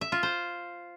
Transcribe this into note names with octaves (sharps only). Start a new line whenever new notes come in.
E5
F4
C5